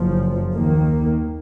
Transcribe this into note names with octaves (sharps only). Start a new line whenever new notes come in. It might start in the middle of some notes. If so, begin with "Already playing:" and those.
Already playing: F#1 F#2 F3
D#2 D#3 A#3